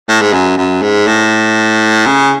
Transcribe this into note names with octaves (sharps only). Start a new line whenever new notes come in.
A2
G#2
F#2
F#2
G#2
A2
C#3